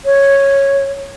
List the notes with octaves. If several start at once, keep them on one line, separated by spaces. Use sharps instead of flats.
C#5